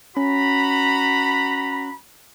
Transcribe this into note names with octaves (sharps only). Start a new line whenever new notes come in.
C#4 F#4 A#5 B5